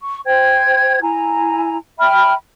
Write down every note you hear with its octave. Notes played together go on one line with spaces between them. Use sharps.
C#6
C5 G5 G#6
E4 G#5 A#5
E5 G5 B5 F6